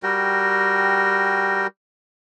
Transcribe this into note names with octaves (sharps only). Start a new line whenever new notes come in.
G3 F#4 A#4 G5